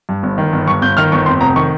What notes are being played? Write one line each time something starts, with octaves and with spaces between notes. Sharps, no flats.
G2
G1
D#3
G1
G2 C#6
G1 G6
D#3 F6
G1 C#6
F2 C6
F1 A#5
D#3 C#6